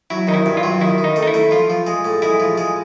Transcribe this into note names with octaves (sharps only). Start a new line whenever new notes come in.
F#3 E4
D#3 D#4
E4
G2
F4
F#3
D#3 E4
D#3
D#4
A3
D#4
E4
A3
F3 F4
F3
G#3
A2
G#3 E4
F3
G#3